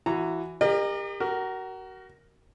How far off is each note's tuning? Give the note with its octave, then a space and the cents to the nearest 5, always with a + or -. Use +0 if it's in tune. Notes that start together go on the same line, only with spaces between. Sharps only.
E3 +15 F#4 +0 A#5 -15
G4 +35 A#4 +0 D#5 -40
F#4 +30 A#4 +0